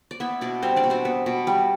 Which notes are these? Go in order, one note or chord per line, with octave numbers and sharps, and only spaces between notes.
D5
B3 E4 E5
B2 D4 D5
G3 C4 C5
D4 D5
B2
C4 C5
B3
B2
G3